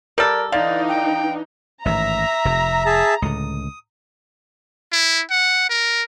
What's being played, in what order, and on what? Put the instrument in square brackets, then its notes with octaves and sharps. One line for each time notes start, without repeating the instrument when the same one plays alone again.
[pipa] G3 A4 [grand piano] A#4 [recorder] D5
[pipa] D3 [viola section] E3 D4 D#4 [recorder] D5 [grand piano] F5
[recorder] G5
[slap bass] A1 G#2 D#3 [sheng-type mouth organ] E5 [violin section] A#5
[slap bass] F1 C3
[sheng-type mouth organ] G#4 E5 A5
[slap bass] C#2 A2 D3 [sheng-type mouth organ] D#6
[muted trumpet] E4
F#5
A#4